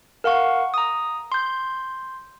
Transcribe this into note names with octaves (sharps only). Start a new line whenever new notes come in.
A#4 F5 F#5 C#6
A#5 D#6
C6 G6